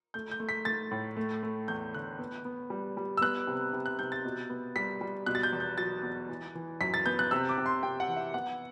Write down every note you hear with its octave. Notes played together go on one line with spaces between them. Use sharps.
A3 G6
G6
A3
B6
A3 A6
A2
A3
A3
E2 G6
D3 F#6
B3
B3
G3
G3
E6
B3 F#6
C3
C3
F#6
C3 G6
A6
B2
B3
G3 B6
G3
B2 F#6
A6
G6
E2
G6
F#3 A6
E2
E3
E3
F#2 B6
A6
B3 G6
F#6
C3 E6
D6
C3
C6
C3 G5
F#5
E3
E5
B3 F#5